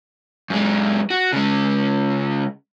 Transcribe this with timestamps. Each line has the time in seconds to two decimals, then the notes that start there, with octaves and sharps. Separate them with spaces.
0.50 F#2 G#3
1.10 F#4
1.33 C#3 G#3